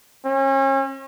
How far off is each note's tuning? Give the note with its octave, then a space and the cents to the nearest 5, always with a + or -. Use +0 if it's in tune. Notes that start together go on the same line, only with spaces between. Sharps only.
C#4 -35